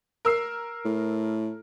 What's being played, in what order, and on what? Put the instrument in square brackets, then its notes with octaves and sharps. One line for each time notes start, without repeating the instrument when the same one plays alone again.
[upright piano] A#4 E6 C7
[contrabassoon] A2